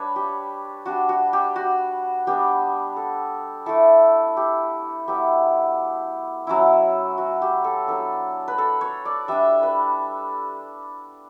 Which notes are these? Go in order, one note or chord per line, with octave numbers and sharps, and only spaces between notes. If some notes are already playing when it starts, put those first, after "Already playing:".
Already playing: G3 D4 B4 C#5
G4
G3 D4 F#4
F#4
G4
F#4
G3 B3 D4 G4
A4
A3 E4 A4
G4
F#3 B3 E4 G4
F#3 C#4 E4
F#4
G4
A4
F#3 B3 D4 A4
B4
A4
C#5
D5
G3 D4 E5
B4